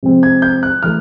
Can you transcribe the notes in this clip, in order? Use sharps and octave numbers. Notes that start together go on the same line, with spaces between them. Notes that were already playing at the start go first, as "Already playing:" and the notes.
C3 F3 G#3 C4
G#6
G6
F#6
E3 A3 F6